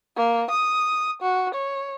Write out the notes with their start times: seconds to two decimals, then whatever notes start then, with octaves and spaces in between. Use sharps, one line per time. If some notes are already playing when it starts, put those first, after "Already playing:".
0.17 A#3
0.50 D#6
1.22 F#4
1.54 C#5